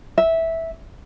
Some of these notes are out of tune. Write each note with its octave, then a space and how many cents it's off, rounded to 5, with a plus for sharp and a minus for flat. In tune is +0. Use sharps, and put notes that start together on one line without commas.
E5 -10